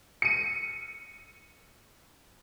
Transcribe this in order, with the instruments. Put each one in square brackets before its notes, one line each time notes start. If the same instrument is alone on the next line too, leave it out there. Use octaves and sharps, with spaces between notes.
[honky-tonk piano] C#7 D#7